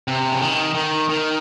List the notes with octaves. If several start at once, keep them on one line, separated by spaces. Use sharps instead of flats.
C3
C#3
D#3
D#3
D#3